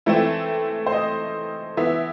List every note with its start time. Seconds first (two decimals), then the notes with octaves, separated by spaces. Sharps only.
0.06 E3 A3 C4 E4
0.87 C5
0.92 D#5
1.77 E3 B3 E5